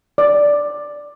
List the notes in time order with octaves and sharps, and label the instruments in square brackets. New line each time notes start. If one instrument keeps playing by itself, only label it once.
[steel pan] D5